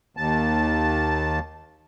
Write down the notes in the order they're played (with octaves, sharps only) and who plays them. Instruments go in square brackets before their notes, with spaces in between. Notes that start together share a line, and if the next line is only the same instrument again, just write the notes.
[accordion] D#2 A5